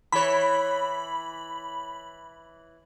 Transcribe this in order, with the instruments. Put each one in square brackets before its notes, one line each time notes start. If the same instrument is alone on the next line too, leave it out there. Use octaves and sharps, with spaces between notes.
[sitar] E3 C#5 [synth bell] B5